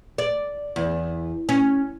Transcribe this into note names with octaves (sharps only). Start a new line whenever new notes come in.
D5
E2
C#4